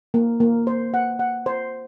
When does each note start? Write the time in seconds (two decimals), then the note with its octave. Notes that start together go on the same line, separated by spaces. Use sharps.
0.14 A#3
0.40 A#3
0.67 C5
0.94 F#5
1.19 F#5
1.46 C5